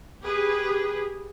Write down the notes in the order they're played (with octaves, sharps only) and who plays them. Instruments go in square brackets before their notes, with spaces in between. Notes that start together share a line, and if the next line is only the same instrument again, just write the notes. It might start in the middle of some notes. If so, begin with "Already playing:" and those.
[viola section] G4 G#4 B4